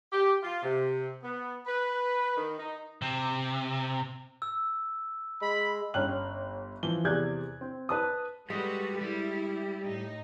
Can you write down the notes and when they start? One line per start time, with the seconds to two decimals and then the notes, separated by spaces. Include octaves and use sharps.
0.12 G4
0.42 F4
0.63 C3
1.23 B3
1.66 B4
2.37 D#3
2.59 D#4
3.02 C3
4.42 E6
5.42 G#3 B5
5.94 G1 C#4 G5 F6 F#6 F#7
6.83 E3 F3 G7
7.04 E2 C3 G#4 D5 F#6 G#6
7.61 C4
7.89 B4 A5 D#6
8.50 G3 G#3 F#4 A4 B4
9.01 G3 E4
9.85 A2 D#4